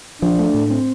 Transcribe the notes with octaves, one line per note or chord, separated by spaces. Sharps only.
F3 D4
A3
A2
C4